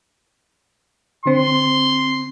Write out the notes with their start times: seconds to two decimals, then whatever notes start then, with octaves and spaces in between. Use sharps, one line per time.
1.26 D3 C4 C6